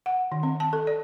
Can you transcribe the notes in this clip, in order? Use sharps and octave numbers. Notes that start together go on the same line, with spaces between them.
F#5
D#3
C4
A5
A4
D5